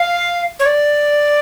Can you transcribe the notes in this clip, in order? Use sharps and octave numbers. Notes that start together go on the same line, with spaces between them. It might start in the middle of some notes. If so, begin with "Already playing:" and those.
Already playing: F5
C#5
D5